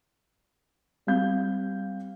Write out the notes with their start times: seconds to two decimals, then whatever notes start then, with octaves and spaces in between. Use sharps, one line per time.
1.07 G3 C4 F5 G6